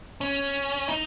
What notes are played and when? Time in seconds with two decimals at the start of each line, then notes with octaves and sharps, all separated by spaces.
0.21 C#4
0.88 D#4